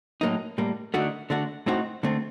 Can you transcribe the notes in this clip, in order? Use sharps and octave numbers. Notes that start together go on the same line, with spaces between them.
A2 F#3 A#3 D#4
A2 G3 A#3
D3 A3 D#4 F#4
D3 A3 D4 F#4
A2 A3 C4 D#4 F#4
D3 A3 C4